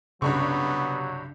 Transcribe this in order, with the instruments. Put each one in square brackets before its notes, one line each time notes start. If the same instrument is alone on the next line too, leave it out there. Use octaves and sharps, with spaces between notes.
[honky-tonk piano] C2 G2 C#6 [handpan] C#3 D4 [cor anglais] F#3 [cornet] B3